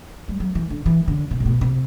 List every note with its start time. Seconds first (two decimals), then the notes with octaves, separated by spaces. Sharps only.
0.28 G3
0.40 F#3
0.55 E3
0.70 D3
0.86 E3
1.08 D3
1.31 C3
1.40 A2
1.46 B2
1.61 C3